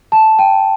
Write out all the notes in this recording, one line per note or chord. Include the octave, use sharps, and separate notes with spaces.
A5
G5